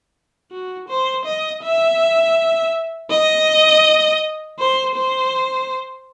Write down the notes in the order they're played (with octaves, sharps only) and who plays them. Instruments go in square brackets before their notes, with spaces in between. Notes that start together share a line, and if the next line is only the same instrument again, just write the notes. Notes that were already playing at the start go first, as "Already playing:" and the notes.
[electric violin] F#4
C5
D#5
E5
D#5
C5
C5